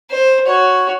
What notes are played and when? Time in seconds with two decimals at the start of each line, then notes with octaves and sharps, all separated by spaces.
0.11 C5
0.47 F#4 C#5